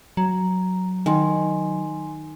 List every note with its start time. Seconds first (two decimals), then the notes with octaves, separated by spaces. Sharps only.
0.17 F#3 A#5
1.06 D#3 G#5 C6